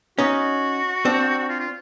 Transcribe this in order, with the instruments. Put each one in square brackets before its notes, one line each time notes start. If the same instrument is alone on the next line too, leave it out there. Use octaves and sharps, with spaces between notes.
[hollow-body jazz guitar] C#4 D#4 [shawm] F#4
[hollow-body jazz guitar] C4 D4
[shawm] F#4
F4
F4